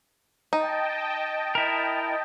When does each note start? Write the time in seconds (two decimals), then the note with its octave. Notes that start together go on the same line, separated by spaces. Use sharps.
0.53 D#4 D#5 G5 A5
1.55 E4 A#4